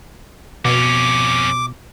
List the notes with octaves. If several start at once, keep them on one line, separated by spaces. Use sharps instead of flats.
F2 B2 C#4 D6